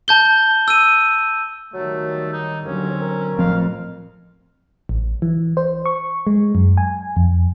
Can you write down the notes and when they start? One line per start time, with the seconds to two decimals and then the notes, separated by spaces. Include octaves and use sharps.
0.08 A5 G6 G7
0.68 E6 D#7
1.74 D#3 F#3 G3 A3
2.33 D#4
2.65 D#2 D3 F#3 C4 C#4
3.01 A#4
3.39 A1 F3 C4 F5
4.89 A1
5.22 E3
5.57 C5
5.86 C#6
6.27 G#3
6.55 F#2
6.77 G#5
7.16 F2